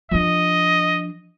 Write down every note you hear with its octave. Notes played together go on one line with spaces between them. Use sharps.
F3 D4 D#5